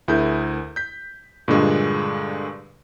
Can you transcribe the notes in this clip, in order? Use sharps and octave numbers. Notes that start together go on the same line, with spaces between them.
D2 E4 G#4 A#4 G6
G6 B6
G2 A#2 D3 G#3